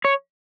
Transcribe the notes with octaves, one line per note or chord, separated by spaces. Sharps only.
C#5